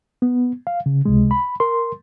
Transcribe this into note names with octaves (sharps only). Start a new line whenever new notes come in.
B3
F5
C#3
C#2 C3 G#3
B5
A#4 C6